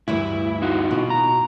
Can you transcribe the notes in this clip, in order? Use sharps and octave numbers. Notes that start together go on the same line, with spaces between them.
D2 G2 E3 E4
D#4 F4 F#4
B2
A#5